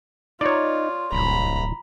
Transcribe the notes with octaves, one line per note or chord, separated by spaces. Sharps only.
D#4 F4 C#5 D5
D1 C2 A#5 B5